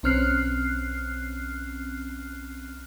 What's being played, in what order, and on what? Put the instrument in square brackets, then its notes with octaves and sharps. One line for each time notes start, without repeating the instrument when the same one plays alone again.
[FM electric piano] B1 C4 C#4 F6 F#6 C7